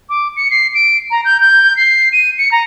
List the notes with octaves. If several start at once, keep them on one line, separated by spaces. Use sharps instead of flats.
D6
C#7
C7
D7
A#5
G6
G6
C7
D#7
C#7
A#5